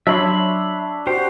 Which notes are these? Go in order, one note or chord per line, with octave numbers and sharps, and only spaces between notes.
F#3 D4 C#5 E5 B5 C6
F#4 G4 C5